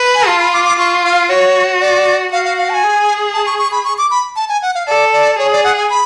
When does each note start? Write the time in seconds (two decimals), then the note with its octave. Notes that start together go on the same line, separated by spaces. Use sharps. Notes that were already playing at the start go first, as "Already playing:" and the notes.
Already playing: B4
0.15 G#5
0.27 F4 A5
0.40 B5
0.53 D6
0.65 D6
0.78 F4 C#6
1.05 F5
1.29 F#4 C#5
1.81 D5
2.31 F#4 F5
2.45 F5
2.58 F5
2.70 A5
2.74 G#5
2.83 G#4
3.33 A5
3.46 C#6
3.59 C#6
3.72 B5
3.85 C#6
3.98 D6
4.11 B5
4.36 A5
4.49 G#5
4.62 F#5
4.75 F5
4.87 A4 D5
5.13 D5
5.38 G#4 C#5
5.52 D5
5.64 F#5
5.77 G#5
5.90 B5